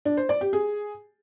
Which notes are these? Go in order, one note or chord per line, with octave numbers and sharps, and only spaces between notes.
D4
C5
D5
G4
G#4